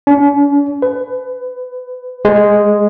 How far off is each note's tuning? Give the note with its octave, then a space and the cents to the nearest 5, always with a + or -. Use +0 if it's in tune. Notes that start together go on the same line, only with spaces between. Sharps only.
C#4 +45
B4 +25
G#3 -5